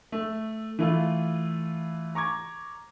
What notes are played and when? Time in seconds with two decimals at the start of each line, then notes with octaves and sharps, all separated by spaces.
0.12 A3
0.79 E3 A3 F4
2.15 A#5 C#6 D6 G#6